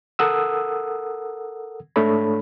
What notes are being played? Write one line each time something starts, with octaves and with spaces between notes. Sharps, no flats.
A4 A#4 F#5 D#6 E6
G#2 A3 D4 A4 C#5 B5